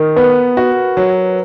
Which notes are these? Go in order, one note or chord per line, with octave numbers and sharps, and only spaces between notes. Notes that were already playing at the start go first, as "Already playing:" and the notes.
Already playing: D#3 A#4
B3 B4
F#4
F#3